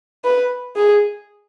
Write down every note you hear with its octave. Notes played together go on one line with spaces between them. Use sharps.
B4
G#4